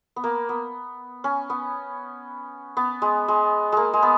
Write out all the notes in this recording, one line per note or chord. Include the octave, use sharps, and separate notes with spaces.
B3
A#3
B3
C#4
B3
B3
G#3
G#3
G#3 A#3
G#3
B3